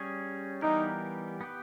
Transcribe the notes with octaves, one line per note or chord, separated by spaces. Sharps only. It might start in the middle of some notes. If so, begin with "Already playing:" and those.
Already playing: G3 C#4 G#4 C#5
E3 G3 B3 D#4 G4 A#4
B3 G4 B4